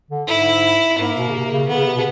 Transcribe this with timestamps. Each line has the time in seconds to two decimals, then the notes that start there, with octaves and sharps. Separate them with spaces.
0.11 D3
0.27 G#2 E4
0.99 G#2 A#3
1.17 B2
1.29 C#3
1.34 C3
1.51 C#3
1.69 D3 B3
1.78 C#3
1.87 C3
1.96 B2